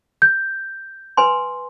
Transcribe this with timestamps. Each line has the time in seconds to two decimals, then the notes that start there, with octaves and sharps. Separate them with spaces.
0.22 G6
1.17 B4 G#5 C6